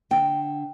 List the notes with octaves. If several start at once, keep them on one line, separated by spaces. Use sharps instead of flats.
D3 G5